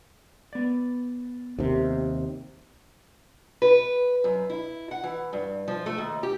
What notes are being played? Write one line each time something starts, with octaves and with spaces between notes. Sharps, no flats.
B3 D5
D#2 C3
B4
F#2
E4
F#5
E3
G2
F3
A3
D#2
G4